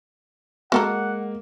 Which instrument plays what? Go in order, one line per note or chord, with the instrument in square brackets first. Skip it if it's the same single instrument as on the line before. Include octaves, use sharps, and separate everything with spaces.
[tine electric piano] G#3 [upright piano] A#3 [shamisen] F#4 A4 A#4 [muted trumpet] F#5